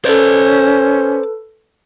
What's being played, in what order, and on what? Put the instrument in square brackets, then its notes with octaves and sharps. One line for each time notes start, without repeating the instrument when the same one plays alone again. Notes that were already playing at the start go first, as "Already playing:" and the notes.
[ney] C#4 [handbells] A4 B4 [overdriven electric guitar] C5 D5